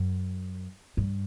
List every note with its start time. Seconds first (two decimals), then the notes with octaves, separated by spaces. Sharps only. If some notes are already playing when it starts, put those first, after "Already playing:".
Already playing: F#2
0.97 G2